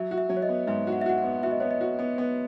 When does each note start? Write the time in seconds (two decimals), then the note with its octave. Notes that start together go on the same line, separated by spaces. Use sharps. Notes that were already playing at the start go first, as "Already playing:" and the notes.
Already playing: F#3 E5
0.11 F#4
0.18 E5
0.29 F#3
0.37 C#5
0.42 D#5
0.49 B3
0.67 G#2 E5
0.87 F#4
0.92 F#5
1.02 E5
1.06 F#4 F#5
1.18 F#5
1.24 B3
1.43 F#4 E5
1.51 D#5
1.60 B3 C#5
1.71 D#5
1.81 F#4
1.99 B3
2.18 B3